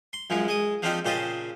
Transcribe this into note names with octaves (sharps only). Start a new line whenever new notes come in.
C6
F#2 F3 G#3
G#3 D#6
F3 C4 D4 D#4 F4 G4
A#2 C#3 G4 C5 D#5 A5